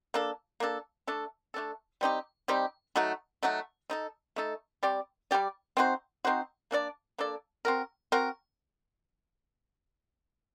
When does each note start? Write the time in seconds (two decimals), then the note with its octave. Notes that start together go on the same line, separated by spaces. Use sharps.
0.14 A#3 D4 A4
0.60 A#3 D4 A4
1.07 A3 D4 A4
1.54 A3 D4 A4
2.01 G3 C4 D#4 G4
2.48 G3 C4 D#4 G4
2.96 F#3 A3 D#4 F#4
3.43 F#3 A3 D#4 F#4
3.90 A3 D#4 A4
4.36 A3 D#4 A4
4.83 G3 C4 G4 D5
5.31 G3 C4 G4 D5
5.77 C4 D#4 F#4 C5
6.25 C4 D#4 F#4 C5
6.71 A#3 D4 A4 D5
7.18 A#3 D4 A4 D5
7.65 C4 F#4 A#4
8.12 C4 F#4 A#4